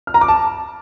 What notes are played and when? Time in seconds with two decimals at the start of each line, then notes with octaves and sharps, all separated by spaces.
0.07 F6
0.14 A#5
0.21 D6
0.28 A5